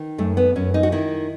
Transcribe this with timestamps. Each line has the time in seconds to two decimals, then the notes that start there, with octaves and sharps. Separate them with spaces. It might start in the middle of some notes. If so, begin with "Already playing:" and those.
Already playing: D#3
0.18 F#2 A3
0.37 B3
0.56 F#2 C#4
0.74 D#4
0.83 F#4
0.92 D#3 E4